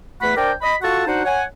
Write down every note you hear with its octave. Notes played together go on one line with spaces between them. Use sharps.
E2 A3 B4 F#5 B5
D4 A#4 C5 D5 G5
D#5 B5
F4 F#4 A4 F#5 A5 C#6
D4 D#4 F#4 C5 F#5
C#5 F#5 G#5